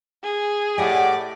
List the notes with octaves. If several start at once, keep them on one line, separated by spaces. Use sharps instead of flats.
G#4
A2 G4 D5 D#5 F#5